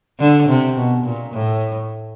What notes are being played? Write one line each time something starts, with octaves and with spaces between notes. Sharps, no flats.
D3
C3
B2
A#2
A2